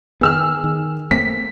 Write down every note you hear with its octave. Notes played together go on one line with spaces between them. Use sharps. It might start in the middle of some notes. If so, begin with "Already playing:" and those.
D#3 B3 G#4 E6 F6
D#3
A3 A#3 C4 B6